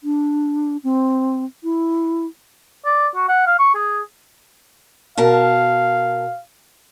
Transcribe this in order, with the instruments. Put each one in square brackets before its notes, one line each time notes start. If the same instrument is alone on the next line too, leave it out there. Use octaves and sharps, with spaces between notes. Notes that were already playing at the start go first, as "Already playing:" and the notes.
[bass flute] D4
C4
E4
[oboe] D5
F#4
F#5
F5
C#6
G#4
[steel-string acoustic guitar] B2 A#4 A5 [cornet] F5